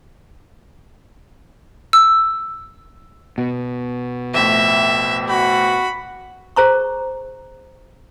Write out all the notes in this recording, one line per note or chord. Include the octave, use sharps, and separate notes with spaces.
E6
B2
F2 A2 E5
F#4 B5
G#4 C5 A#5 C#6